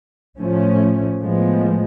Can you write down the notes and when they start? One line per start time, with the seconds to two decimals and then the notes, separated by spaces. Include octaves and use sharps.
0.39 A2 F3 A3 C#4
1.20 A2 F3 G#3 B3